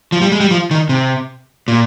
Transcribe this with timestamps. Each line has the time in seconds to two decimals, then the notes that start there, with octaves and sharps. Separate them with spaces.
0.12 F3
0.22 G3
0.32 G#3
0.40 G3
0.51 F3
0.71 D#3
0.89 C3
1.68 A#2